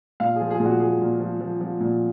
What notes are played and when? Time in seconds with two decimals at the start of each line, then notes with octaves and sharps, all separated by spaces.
0.20 A#2 F5
0.36 G#4
0.41 F3
0.51 G#4
0.60 A#2
0.65 F#4
0.80 F3 G#4
1.01 A#2
1.20 F3
1.41 F3
1.61 F3
1.80 A#2